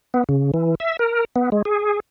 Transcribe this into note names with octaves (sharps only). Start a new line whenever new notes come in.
B3
C#3
E3
E5
A#4
B3
G#3
G#4